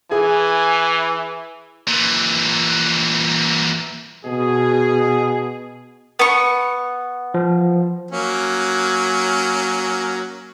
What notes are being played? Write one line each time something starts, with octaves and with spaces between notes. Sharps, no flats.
E3 G#4 G#5
A#2 E3
B2 G#4
B3 C#6
F3
F#3 A#3 C#4